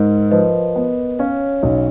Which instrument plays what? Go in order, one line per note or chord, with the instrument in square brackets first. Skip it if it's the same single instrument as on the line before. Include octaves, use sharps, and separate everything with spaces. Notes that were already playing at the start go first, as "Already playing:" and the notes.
Already playing: [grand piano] G#2 [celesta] A#4
[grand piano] F3 [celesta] B4 D#5
[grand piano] B3
[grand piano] C#4 [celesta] C#5 F5
[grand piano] B1